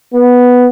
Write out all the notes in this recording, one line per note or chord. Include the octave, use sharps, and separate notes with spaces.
B3